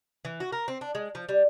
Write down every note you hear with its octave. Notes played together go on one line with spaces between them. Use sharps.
E3
F#4
A#4
C4
D4
G#3
F3
G3